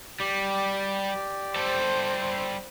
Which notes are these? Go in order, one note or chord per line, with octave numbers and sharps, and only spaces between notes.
G3 G4 D5
G3 A4 C5